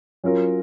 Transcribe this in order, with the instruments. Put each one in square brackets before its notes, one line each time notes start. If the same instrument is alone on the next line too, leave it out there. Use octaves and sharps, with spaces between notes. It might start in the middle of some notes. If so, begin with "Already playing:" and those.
[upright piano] F#3 C#4 F4 A#4